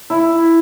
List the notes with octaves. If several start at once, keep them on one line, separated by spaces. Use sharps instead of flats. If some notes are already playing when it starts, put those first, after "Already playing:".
E4